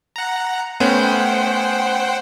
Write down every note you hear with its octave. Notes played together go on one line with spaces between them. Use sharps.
F#5 A#5
A3 B3 C#4 C5 F#5 G5